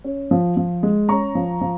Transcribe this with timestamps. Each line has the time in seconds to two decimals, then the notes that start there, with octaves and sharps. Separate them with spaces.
0.04 C#4
0.31 F3
0.57 F3
0.83 G#3
1.09 C#4 A#5 C#6
1.35 F3
1.61 F3